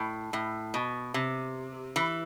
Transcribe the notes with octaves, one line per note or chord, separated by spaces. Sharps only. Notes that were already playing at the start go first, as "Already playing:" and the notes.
Already playing: A2
A2
B2
C3
E3